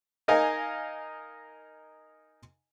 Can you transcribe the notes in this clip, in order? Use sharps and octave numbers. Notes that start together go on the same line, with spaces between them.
D#4 A#4 D#5 F5 G#5